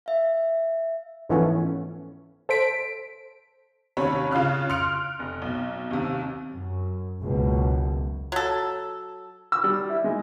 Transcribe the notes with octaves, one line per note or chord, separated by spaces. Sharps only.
E5 F5
G#2 E3 F3 A3 B3 C#4
A4 C5 B6 D7
D#2 C3 C#4 C#5 B5
C#3 F4 F5 F6 F#6
C6 F6 F#6 C#7 D7 F7
F1
B1
D#2 C3
F#2
F#1 C#2 F#2 B2
F#3 A4
E6
G3
E4
G#3